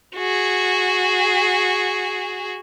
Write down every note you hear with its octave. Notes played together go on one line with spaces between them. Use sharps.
F#4 G#4